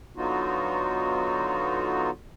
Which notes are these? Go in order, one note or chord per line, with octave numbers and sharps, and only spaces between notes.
D3 F#3 B3 D#4 F4 F#4